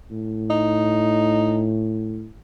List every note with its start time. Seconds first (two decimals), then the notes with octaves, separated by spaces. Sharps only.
0.11 A2
0.50 D#4